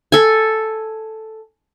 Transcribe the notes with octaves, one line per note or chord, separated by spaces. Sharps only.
A4 G#5